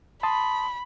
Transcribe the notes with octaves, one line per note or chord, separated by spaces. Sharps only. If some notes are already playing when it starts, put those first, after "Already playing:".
A5 B5 C6 D#6